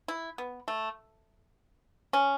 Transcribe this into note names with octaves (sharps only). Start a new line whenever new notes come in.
E4
B3
A3
C#4